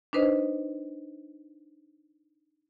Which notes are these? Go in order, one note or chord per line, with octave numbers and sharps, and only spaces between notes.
D4 D#4 B4 C5 D#5